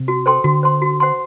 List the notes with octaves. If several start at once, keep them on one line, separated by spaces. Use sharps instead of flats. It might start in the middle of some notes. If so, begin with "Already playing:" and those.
Already playing: C3
F#4
A4 C5 G5 C6
D3 F#4
C5 F#5 C6
F#4
C5 F#5 C6